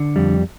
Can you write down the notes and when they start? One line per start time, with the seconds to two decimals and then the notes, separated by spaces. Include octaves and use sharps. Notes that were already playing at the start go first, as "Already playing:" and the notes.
Already playing: D3
0.16 F2 G3